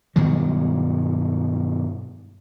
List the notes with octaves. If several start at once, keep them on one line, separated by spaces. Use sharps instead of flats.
G2 B2 D#3 F#3